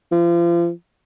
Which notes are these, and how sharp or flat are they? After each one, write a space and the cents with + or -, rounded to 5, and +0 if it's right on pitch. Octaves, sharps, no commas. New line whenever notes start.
F3 -35